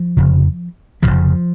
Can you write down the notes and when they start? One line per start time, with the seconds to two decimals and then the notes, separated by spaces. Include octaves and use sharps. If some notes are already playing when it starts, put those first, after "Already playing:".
Already playing: F3
0.17 F1 F2 C#3
1.02 D#2 C#3 F3
1.07 F1